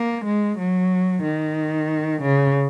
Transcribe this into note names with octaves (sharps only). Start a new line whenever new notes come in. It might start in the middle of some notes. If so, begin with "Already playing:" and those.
Already playing: A#3
G#3
F#3
D#3
C#3